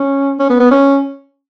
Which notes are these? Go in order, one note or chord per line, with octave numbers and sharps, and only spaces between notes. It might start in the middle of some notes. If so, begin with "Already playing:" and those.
Already playing: C#4
C#4
B3
B3
C#4